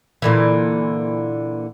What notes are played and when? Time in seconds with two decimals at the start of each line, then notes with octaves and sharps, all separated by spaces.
0.22 A#2 D3 E3